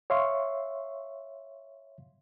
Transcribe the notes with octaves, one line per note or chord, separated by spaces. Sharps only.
C#5 E5 F5 C6 C#6